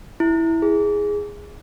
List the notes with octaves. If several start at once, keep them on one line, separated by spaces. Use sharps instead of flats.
E4
G#4